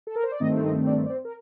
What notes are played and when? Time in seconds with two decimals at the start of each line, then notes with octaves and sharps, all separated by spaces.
0.07 A4
0.16 A#4
0.23 C5
0.32 D5
0.40 G2 D#3 A3 C4 D#4 D#5
0.63 D#4 D#5
0.86 D4 D5
1.06 D5
1.09 C4 C5
1.25 A#4